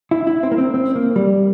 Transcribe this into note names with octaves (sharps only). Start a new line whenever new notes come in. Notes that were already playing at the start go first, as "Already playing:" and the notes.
E4
E4
C4
A#3
C4
C4
A#3
G3